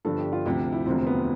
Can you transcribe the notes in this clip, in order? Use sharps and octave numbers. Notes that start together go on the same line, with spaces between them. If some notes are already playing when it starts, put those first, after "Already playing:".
G1 G2 D3 F3 A4
G4
F4
D2 C3 F3 G4
E4
E1 D2 C3 F3 C4
B3